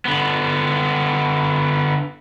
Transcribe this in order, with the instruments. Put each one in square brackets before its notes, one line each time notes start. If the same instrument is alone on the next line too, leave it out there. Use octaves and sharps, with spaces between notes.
[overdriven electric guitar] D3 B3